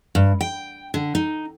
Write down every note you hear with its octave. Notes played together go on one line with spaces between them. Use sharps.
G2
G5
D3
D#4